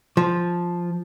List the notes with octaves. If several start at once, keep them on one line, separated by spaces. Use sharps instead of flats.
F3